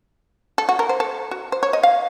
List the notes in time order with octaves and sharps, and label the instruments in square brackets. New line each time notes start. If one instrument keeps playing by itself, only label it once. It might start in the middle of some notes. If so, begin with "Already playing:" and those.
[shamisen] A4
F#4
A#4
C5
A4
F#4
C5
C#5
D#5
F5